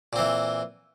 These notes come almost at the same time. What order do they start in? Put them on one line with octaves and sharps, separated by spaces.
A#2 C4 E3